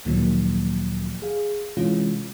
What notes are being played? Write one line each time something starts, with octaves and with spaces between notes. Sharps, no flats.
D2 A#2 D#3 F3 F#3 A#3
G#4 F5
C3 E3 G#3 C#4 F4